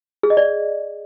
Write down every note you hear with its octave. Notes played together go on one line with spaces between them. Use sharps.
G#4
D#5
D5